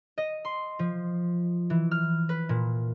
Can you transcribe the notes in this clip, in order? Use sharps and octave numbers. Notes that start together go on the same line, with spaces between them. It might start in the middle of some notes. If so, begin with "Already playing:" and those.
D#5
C6
F3
E3
F6
B4
A#2